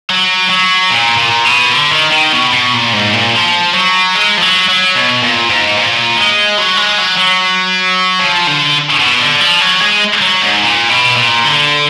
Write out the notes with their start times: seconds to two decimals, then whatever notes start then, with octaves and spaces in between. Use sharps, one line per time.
0.10 F#3
0.50 F#3
0.91 A#2
1.18 A#2
1.45 B2
1.72 D3
1.92 D#3
2.12 D#3
2.33 B2
2.53 B2
2.73 A#2
2.93 G#2
3.13 A#2
3.33 F3
3.74 F#3
4.15 G#3
4.37 F3
4.42 F#3
4.69 F#3
4.96 B2
5.23 A#2
5.49 G#2
5.77 A#2
6.17 G#3
6.58 F#3
6.77 G#3
6.98 F#3
7.18 F#3
8.19 F3
8.47 D3
9.00 B2
9.20 D3
9.41 F3
9.61 F#3
9.81 G#3
10.21 F#3
10.42 G#2
10.63 A#2
10.89 B2
11.16 A#2
11.44 D3